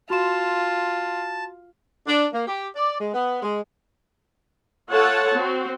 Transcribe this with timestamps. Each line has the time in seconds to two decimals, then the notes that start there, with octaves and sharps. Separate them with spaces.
0.10 F4 F#4 A5 C6 E7
2.07 D4
2.33 A#3
2.47 G4
2.76 D5
3.01 G#3
3.13 B3
3.41 G#3
4.89 F4 A4 C#5 F#5 A5
5.33 C4 F#4